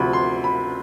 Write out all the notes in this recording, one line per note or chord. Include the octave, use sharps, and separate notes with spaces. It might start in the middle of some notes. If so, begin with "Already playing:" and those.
Already playing: D2 C3 F3 B5
C6
B5